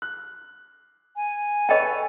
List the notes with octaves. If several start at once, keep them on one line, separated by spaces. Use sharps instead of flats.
F#6
G#5
A4 B4 C#5 D#5 G5